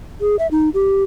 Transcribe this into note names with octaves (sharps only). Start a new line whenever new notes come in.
G#4
E5
D#4
G4